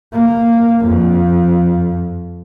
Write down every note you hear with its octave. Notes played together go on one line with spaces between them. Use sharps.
A#3
F2